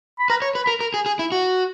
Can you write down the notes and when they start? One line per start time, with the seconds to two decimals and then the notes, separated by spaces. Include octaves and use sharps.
0.19 B5
0.30 B4 A#5
0.42 C#5
0.55 B4
0.64 B5
0.67 A#4
0.81 A#4
0.94 G#4
1.06 G#4
1.19 E4
1.32 F#4